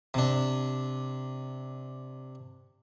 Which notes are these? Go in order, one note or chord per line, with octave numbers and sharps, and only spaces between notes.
C3 D4